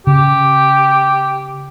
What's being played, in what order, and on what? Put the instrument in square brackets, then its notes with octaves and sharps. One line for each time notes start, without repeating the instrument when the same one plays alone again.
[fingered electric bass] C#3 [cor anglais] G4